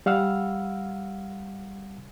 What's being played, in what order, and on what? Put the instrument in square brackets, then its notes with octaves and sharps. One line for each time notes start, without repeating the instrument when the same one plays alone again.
[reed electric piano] G3 F5 F#5 E6 F6